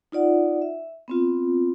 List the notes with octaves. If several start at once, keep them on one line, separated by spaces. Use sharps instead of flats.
D#4 F4 D5 F#5
E5
B3 C4 F4